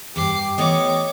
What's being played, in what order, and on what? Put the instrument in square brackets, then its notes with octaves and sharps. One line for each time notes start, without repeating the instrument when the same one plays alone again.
[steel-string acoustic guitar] E2 G2 [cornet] G4 [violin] D6 C7
[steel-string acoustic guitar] E3 A3 B3 [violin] C#5 D6 [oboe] D#5